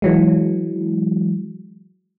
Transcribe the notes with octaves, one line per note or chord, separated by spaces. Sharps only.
E3 F#3 G#3